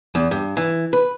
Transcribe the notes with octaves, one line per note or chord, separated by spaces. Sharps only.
E2
G2
E3
B4